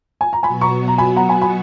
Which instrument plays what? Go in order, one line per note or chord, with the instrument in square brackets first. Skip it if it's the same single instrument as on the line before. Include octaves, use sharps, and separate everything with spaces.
[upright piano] G#5
A#5
[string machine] B2 F#3 B3 F#4 [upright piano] G#5 B5
[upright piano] A#5 C#6
A#5
G#5 B5
F#5 A#5
G#5 B5
G#5 B5